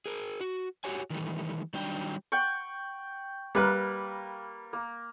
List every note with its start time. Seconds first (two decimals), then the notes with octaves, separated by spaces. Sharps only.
0.06 G#4 A#4
0.41 F#4
0.84 F#4 G4 C#5 G#5
1.10 D#3 E3 G3 A3
1.74 D#3 F#3 G3 D4 G5
2.32 F#5 G5 C#6
3.55 G3 A#3 A#4 B4 F#6
4.73 A#3